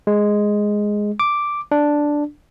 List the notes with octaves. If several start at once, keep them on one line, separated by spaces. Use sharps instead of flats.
G#3
D6
D4